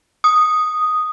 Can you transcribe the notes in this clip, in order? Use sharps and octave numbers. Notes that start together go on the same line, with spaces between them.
D#6